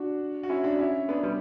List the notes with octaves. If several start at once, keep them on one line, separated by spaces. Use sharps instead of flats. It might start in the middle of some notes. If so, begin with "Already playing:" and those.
Already playing: D4 F#4
F#4
C#4 E4
D4 F#4
C#4 E4
B3 D4
G3 B3